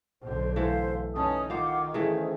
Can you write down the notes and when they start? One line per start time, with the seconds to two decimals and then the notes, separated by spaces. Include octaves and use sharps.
0.22 B1 D3 C5
0.56 E3 A3 C5 F5 F#5
1.15 C#4 D#4 B4 A5 D#6
1.50 D#3 F4 C5 F5 F#5 D6
1.94 C#3 E3 A3 G#4 C5